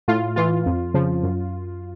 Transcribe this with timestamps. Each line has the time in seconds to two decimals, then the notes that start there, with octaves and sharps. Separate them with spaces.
0.08 A2 F4
0.36 E3 F4
0.66 F2
0.94 C#3 F3
1.23 F#2